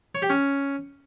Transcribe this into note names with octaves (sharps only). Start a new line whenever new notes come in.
C#5
G4
C#4